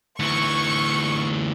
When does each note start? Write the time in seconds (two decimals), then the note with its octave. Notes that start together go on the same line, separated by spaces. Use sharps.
0.19 D2 E3 C#6